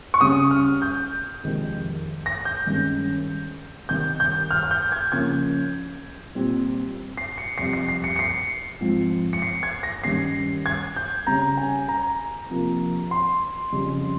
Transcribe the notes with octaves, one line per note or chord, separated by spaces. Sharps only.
C#6
C#3 G3 C#4 D#6
F6
G6
F2 C3 D#3 G#3 C4
A#6
G6
G2 D#3 G#3 C#4
C3 D#3 G3 C4 G6
G6
F6
F6
G6
G#6
C#3 F3 A#3 C#4 G#6
A#2 G3 C4
C7
C#7
F2 C3 G3 C7
C7
C7
C#7
C#7
C7
G#2 F3 C4
C#7
C7
G#6
A#6
G2 D#3 G3 C#4 C7
G#6
G6
C#3 G3 C#4 A#5
G#5
A#5
C3 F3 A#3
C6
F2 C#3 G3 C4